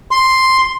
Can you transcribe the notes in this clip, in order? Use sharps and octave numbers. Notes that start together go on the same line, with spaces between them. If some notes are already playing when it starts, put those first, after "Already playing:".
C6